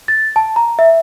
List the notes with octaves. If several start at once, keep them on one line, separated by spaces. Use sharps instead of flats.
A6
A5
A#5
E5